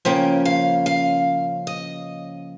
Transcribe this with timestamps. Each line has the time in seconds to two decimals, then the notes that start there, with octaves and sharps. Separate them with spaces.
0.05 C#3 F3 A#3 C#4 G5
0.45 F5
0.86 F5
1.67 D#5